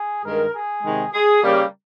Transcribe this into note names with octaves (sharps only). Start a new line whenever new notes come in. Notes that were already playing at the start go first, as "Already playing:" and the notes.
Already playing: G#4
G2 D#3 G#3 A#4
G#4
C3 D#3 G#3
G#4
C#3 G3 A#3